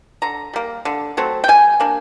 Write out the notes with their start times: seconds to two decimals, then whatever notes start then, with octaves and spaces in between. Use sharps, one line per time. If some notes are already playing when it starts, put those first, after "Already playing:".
0.22 D3 A#5
0.53 G3 A#3
0.85 D3
1.17 F#3 A3 C4
1.44 G5
1.48 G3 G#5
1.80 A#3 D4